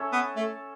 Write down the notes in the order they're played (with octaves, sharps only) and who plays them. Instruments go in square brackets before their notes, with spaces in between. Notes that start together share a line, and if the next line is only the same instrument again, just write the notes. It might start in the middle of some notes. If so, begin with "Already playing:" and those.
Already playing: [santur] C#4 A4 C#5 E5
[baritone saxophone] B3
A3